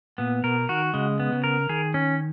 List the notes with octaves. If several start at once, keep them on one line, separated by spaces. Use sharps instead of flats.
A#2 B3
B2 A#4
D#3 F#4
C#3 G#3
B3
C#3
A#4
D#3 G#4
C#4